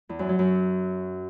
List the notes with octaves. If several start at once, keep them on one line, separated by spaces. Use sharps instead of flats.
E2
F#2
F#3
F#2